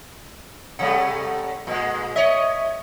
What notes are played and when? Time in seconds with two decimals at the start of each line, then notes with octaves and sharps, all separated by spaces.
0.79 C3 G3 A3 F#5
1.67 A#2 G#3
2.16 C#5 D#5 E5